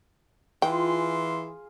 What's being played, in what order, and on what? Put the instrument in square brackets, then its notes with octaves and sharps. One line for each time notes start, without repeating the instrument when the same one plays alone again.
[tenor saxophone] E3 [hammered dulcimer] F4 G#4 [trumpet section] F5 C6 [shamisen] G5